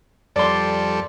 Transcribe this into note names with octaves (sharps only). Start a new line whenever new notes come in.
F2 G3 A4 D5 C6